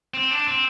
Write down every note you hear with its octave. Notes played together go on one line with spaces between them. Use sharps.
C4
D4
C4